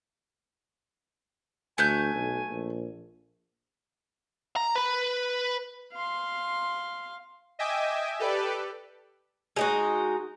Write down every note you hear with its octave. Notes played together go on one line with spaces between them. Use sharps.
D2 A3 G#5 F#6 G6
B1
A#1
A#5
B4 B5
F5 C6
D#5 E5 G5 G#5 D6
G4 A4 B4 D5
G#3 D#4 F#4